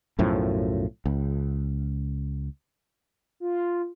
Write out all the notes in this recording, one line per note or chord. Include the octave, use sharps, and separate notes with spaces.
B1 F#2 A2 F3
C#2
F4